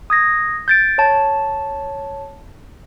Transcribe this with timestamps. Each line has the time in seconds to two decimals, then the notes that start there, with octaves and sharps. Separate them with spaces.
0.10 D#6 G#6 A#6
0.68 G6 A6 D7
0.98 C#5 A5